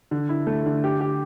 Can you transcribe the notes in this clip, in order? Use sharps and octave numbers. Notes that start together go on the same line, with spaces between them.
D3
E4
A3
D3
G4
G4